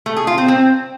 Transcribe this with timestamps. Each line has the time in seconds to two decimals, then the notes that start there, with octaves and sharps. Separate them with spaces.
0.06 A3
0.17 G#4
0.27 F4
0.38 C4
0.48 C4